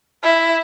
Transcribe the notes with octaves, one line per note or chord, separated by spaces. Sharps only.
E4